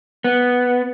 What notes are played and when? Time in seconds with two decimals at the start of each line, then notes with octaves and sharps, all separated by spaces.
0.24 B3